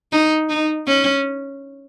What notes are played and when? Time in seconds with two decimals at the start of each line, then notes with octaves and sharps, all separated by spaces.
0.12 D#4
0.49 D#4
0.87 C#4